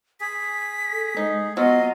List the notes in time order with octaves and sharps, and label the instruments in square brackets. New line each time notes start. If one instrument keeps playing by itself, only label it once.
[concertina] G#4 [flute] B6
[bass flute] A4
[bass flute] G#3 [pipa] D#4
[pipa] F#3 [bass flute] B3 [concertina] F4 F5 [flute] D#5